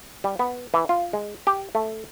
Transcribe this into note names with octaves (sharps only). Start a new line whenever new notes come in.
G3
B3
E3
F4
G#3
G4
A3